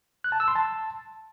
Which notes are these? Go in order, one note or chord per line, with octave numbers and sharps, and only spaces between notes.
F#6
A5
E6
C6
A5